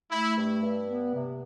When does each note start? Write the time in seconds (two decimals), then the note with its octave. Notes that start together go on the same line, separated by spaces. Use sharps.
0.11 A3 E4
0.37 G2
0.62 G2
0.88 B3
1.13 C3